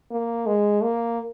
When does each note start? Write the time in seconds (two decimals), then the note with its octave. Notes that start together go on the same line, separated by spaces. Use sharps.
0.11 A#3
0.46 G#3
0.82 A#3